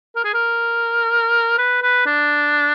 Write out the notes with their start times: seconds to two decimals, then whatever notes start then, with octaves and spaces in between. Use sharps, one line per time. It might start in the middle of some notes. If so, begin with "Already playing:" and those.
0.16 A#4
0.25 G#4
0.34 A#4
1.58 B4
1.82 B4
2.06 D4